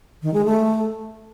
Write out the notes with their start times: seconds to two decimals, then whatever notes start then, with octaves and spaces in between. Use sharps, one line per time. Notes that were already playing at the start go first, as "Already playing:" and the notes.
0.22 D#3
0.34 G#3
0.45 A3